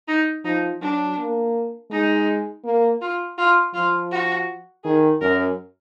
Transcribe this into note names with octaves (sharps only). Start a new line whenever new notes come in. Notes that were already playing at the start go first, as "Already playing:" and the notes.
D#4
F3 D#4
F#3 D4
A#3
G#3 D#4
A#3
F4
F4
F3 F4
F#4
D#3 G#4
F#2 A#4